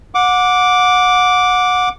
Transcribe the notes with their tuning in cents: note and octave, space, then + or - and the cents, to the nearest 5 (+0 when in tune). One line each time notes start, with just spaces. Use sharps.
F#5 -25 D6 -5